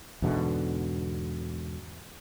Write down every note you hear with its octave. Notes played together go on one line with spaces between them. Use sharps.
E2 G#2 B2 D3